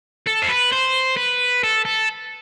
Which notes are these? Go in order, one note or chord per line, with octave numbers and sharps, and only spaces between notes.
A4
C5
B4
C5
B4
A4
A4